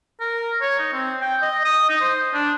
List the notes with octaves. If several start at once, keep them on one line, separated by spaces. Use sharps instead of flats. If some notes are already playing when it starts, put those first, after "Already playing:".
A#4
C#5
D#4
C4
G5
D#5
D#6
D#4
C5
D4